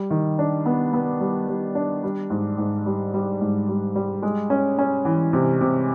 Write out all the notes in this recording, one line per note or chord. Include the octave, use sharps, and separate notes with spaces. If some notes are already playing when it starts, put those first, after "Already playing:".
Already playing: G3
D#3
D4
B3
B3
G3
G3
D4
G3
G#2
G#2
G3
G3
G#2
G3
G3
G#3
C#4
C#4
E3
C3
C3